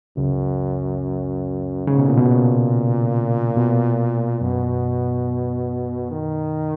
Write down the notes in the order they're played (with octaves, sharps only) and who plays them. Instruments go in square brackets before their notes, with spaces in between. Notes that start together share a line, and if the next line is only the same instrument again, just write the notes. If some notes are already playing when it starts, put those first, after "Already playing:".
[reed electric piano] C#2 C#3 [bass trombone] F#2
[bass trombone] G#2 [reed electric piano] C#3
[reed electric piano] B2
A#2
B2
[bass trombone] A#2
[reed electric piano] B2
[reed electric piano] F#2 [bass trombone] B2
[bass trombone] D#3